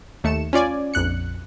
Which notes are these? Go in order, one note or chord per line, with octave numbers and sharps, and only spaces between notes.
D#2 A3 C#7 E7
C#4 F4 D5 G#5
A#1 F2 F#6 C#7